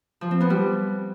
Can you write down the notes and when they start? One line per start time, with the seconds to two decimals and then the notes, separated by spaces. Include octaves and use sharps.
0.21 F3
0.31 C4
0.41 B3
0.50 G3